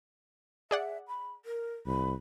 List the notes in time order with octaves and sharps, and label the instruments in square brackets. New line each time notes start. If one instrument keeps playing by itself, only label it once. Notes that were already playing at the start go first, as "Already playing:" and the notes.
[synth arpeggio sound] G#4 D5 F#5 [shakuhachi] E5
[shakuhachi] B5
A#4
[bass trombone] C2 [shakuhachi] B5